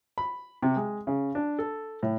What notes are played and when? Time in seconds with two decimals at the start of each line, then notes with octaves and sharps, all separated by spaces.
0.18 B5
0.63 C3
0.76 G#3
1.07 C#3
1.35 D4
1.59 A4
2.03 A2